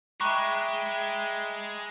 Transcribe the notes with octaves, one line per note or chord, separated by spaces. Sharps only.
G#3 E5 G5 A#5 B5 C#6 D6 F#6